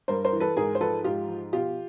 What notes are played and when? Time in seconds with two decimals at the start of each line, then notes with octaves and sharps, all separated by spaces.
0.08 G2 A#4 C5
0.25 A#4 C5
0.33 E3
0.40 A4 B4
0.56 G#2 G#4 A#4
0.75 C5
0.80 F3 A4 B4
1.04 G#2 F4 G4
1.29 F3
1.53 B2 F4 G4